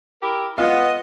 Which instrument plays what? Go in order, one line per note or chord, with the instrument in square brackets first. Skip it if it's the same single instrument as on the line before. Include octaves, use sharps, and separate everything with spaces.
[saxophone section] E4 G4 A#4
[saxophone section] B3 [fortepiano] F4 F5 [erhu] D#5